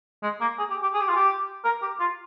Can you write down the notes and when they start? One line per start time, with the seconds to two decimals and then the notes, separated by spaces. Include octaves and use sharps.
0.23 G#3
0.41 A#3
0.59 G#4
0.70 G4
0.83 G4
0.94 G#4
1.01 G4
1.09 F4
1.16 G4
1.65 A#4
1.82 G4
2.00 F4